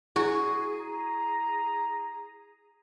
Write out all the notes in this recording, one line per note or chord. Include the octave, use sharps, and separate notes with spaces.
E4 F#4 G#4
A#5